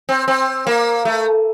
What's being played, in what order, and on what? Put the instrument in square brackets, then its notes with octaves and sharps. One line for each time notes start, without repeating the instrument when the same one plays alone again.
[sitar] C4
C4
A#3
A3